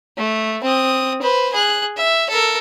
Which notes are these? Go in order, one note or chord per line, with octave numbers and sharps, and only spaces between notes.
A3
C4 D#6
B4 C5
G#4 F#6
E5
A4 A#4